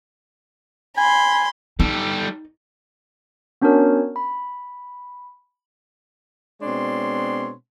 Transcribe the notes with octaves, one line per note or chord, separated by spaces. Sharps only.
G#5 B5 C6
G3 D#4 A4
B3 C#4 D4 F#4 A#4 C#5
B5
B2 G#3 C4 D4 C#5 C6